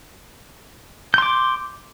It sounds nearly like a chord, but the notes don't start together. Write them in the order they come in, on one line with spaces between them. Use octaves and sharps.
G6 C6 D6